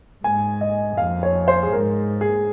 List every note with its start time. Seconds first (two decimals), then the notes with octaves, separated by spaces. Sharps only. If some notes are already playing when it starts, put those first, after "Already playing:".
0.24 G#2 G#5
0.61 D#5
0.97 F2 F5
1.23 C#5
1.48 C5
1.63 G#4
1.72 G#2 A#4
2.21 G#4